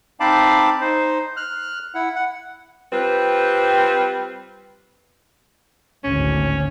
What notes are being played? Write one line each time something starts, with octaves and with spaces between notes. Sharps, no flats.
C4 D#4 F5 A5 B5 D6
D#4 C5
F6 F#6
E4 F#5
F#5
G3 C4 F4 B4
G#1 D2 A2 C#4